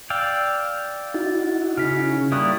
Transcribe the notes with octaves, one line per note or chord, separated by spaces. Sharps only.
D5 F5 G5 E6
D#4 E4 F#4 A6
C#3 F6 B6
G3 A#3 E4 C#6 D#6 F#6